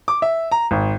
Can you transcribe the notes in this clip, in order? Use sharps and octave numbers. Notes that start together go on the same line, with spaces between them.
D6
E5
A#5
G#1